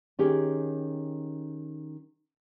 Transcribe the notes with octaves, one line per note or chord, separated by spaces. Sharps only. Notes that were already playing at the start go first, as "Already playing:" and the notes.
D#3 C#4 G4 G#4